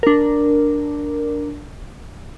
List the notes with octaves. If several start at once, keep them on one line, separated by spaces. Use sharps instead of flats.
D4 A#4